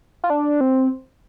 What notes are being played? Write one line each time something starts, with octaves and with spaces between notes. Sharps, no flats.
F4
D4
C4